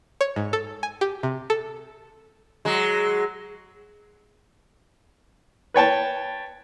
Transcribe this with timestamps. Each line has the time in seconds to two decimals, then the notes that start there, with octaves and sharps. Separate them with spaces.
0.21 C#5
0.36 G#2
0.53 A4
0.83 G#5
1.01 G4
1.23 C3
1.50 A4
2.65 F#3 G#3
5.74 B4 C#5 G5 A5